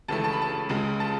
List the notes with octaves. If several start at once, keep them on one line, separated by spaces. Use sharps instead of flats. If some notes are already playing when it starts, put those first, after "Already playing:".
C#2 C#3 E3 A3 A5
A5
B5
A5
C#2 C#3 G#3
A5